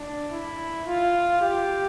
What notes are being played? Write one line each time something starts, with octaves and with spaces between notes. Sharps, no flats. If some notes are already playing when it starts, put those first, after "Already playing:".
Already playing: D4
E4
F4
G4